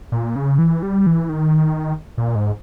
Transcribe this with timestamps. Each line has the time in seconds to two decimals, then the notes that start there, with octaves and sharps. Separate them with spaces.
0.12 A#2
0.36 C#3
0.58 E3
0.83 G3
1.07 E3
1.29 D#3
2.18 A#2
2.35 G#2